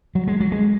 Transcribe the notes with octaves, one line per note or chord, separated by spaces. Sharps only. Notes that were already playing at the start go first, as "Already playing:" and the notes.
F#3
G#3
F#3
G#3